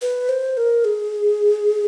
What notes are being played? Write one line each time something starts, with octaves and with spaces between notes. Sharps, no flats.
B4
C5
A#4
G#4